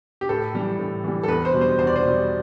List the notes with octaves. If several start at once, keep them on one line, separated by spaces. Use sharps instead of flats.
G4
A2 A4
E3 G3
A2
E3 G3
A4
E2 B4
C5
B2 G3
C5
E2 C5
D5
C5
B2 G3